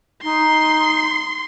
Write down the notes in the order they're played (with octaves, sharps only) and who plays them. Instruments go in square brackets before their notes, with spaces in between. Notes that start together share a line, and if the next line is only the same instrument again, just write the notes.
[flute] D#4 [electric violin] C6